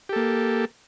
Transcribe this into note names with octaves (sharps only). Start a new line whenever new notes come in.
A#3 G4 A4